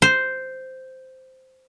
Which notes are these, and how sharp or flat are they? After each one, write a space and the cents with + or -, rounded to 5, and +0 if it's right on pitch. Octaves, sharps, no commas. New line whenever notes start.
C5 -5